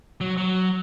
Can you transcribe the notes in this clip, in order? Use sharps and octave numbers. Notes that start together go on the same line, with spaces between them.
F#3
F#3